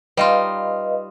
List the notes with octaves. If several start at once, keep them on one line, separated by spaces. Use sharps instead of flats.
G3 D#4 F4 B4 D#5 F5